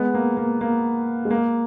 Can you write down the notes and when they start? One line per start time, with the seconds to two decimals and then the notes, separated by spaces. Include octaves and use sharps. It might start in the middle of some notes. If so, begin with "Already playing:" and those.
Already playing: G#3 B3
0.14 A#3
0.37 A#3
0.61 A#3
1.25 G#3
1.31 A#3